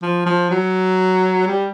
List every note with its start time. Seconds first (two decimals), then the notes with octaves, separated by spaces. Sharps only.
0.02 F3
0.26 F3
0.51 F#3
1.47 G3